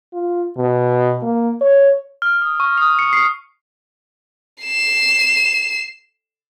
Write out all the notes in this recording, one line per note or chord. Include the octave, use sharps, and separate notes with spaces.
F4
B2
A#3
C#5
F6
D#6
C#6
D#6
C#7
C7
C7 E7